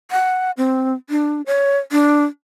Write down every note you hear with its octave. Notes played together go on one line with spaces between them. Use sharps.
F#5
C4
D4
C#5
D4